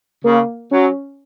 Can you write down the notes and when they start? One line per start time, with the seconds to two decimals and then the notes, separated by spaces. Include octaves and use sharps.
0.24 C#3 A#3
0.71 F#3 C#4